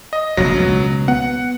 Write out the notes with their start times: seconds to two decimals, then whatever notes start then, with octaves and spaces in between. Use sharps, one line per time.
0.13 D#5
0.37 F1 A#1 F#3 A#6
0.57 C#2 B2
1.08 B3 F#5